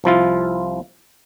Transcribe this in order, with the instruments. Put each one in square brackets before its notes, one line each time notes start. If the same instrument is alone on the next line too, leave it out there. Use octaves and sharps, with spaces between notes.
[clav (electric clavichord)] C2 F3 E4 F4